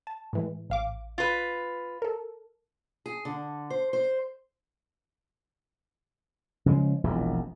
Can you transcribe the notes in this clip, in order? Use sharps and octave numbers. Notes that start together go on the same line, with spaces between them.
A5
A2 E3 G#3
A1 F5 D6
F4 B4
A4 A#4
G#4
D3
C5
C5
C#3 F3 G#3
E1 A#1 E2